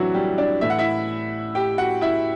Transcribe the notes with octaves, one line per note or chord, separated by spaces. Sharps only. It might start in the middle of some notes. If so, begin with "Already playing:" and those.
Already playing: A2 E3 F#3 C4 D4 E4 F#4
G3 G4
D4 D5
A2 E3 E5
F#5
E4 E5
G4 G5
F#4 F#5
E4 E5